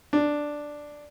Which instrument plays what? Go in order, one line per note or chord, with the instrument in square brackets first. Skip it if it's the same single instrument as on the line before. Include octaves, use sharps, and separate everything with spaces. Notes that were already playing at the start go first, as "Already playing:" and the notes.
[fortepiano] D4